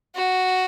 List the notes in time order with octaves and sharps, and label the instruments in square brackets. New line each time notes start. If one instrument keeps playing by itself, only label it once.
[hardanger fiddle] F#4